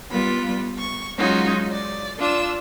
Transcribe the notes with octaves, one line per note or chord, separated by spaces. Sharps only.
G3 B3 F4 B5
C#6
F#3 G#3 C#4 D#4 F4 F#4
D5
D4 F4 E6